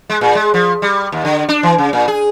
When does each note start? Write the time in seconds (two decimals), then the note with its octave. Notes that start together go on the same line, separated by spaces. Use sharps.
0.10 G#3
0.21 A#2
0.35 G#3
0.54 F3
0.82 G3
1.12 D#2
1.25 D3
1.49 D4
1.63 E3
1.78 C#3
1.93 A#2
2.08 G#4